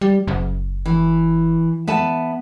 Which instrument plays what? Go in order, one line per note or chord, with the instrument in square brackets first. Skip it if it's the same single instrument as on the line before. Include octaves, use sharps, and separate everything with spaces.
[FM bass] G3
F#1
[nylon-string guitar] E3
B3 E5 A5